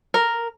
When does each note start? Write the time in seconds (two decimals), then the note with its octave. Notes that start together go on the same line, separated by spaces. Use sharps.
0.14 A#4